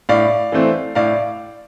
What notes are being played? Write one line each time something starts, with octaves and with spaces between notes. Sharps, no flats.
A2 D5 F5
E3 A3 C4
A2 D5 F5